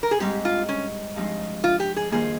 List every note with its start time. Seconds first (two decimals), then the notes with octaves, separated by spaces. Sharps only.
0.03 A#4
0.11 G#4
0.20 G#2 G3 C4 D#4 G4
0.45 F4
0.69 C#4
1.16 G2 F3 G#3 C4 D#4
1.64 F4
1.80 G4
1.96 G#4
2.11 G2 D#3 A#3 F4 G#4 C5